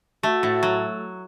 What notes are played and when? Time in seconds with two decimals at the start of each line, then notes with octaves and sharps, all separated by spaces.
0.23 A3 F#4
0.43 A2
0.63 F#3